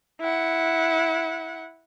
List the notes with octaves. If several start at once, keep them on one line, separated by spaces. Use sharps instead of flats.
E4 F#5